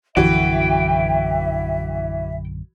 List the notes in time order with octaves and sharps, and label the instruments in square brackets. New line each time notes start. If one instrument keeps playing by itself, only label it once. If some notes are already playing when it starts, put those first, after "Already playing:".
[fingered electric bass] A#1 F#2 D3 [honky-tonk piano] E3 F#4 [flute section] E5 [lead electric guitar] G5